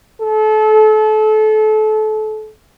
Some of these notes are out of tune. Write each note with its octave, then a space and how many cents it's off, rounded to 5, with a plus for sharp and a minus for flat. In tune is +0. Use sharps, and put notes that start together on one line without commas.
A4 -30